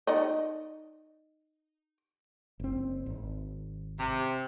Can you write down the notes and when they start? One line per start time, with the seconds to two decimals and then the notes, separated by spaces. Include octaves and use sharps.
0.07 D#4 D5 D#5
2.60 F#1 C4
3.06 G#1
3.98 C3